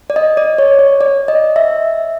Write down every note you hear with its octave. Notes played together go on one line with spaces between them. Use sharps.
D5
D#5
D5
C#5
C#5
D5
D#5
E5